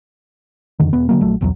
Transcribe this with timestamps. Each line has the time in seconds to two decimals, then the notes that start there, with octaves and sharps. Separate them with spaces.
0.79 F2 D3 D#3
0.93 E1 B3
1.09 D3 F3 F#3 A#3
1.20 A#1 F#3 A3
1.41 B1 E2 C#3 F#3